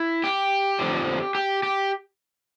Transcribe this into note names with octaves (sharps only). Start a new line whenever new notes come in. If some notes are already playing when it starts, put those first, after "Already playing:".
Already playing: E4
G4
F2 D3 F3
G4
G4